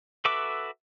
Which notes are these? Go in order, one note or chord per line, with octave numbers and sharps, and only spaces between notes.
F#4 A4 B4 E5 D6